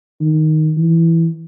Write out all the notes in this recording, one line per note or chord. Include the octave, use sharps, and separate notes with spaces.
D#3
E3